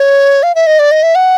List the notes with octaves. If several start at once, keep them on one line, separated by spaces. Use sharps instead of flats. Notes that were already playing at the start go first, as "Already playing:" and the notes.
Already playing: C#5
F5
E5
D#5
D5
D#5
E5
F#5